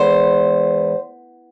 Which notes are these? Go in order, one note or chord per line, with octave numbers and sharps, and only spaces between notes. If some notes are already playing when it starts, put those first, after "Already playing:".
Already playing: E2 G#3 B3 C5